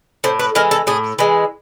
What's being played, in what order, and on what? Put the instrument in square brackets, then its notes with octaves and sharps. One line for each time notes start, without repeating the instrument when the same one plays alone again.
[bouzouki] A2 C5
B4
E3 G#3 A#4
A4
A2 G#4
E3 G#3